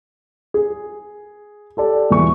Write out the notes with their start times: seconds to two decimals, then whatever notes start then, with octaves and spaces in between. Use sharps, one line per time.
0.54 G#4
1.77 G4 A4 D5
2.10 E1 E3 C#6